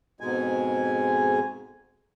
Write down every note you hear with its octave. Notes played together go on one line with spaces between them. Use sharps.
F2 G#2 B2 G#3 G#5